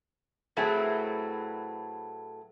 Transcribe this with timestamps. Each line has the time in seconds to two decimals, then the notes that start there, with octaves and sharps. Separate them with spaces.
0.57 A2 F#3 A3 B3 C4 G#4